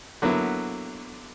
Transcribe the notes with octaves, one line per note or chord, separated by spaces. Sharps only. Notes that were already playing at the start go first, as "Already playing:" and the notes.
D3 F#3 A#3 B3 E4